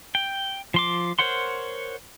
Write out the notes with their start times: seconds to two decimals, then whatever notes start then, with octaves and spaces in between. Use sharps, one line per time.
0.15 G5
0.74 F3 C6 D6
1.19 A#4 C5 C#5 F#5 C6